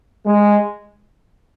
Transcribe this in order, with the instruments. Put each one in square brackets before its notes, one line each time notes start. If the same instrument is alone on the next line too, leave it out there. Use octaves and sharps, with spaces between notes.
[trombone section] G#3